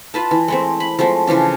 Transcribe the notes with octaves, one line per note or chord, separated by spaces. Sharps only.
F4 B4 A5
E3
G#3 A3 C4
B5
F3 G#3 A3 C4
C#3 E3 F3 D4